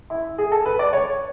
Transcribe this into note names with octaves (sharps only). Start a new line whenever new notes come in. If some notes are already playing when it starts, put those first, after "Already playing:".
E4
G#4
A4
B4
D5
C#5